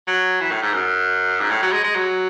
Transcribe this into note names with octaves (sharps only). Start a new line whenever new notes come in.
F#3
E3
A2
G#2
F#2
G#2
A2
F#3
G#3
G#3
F#3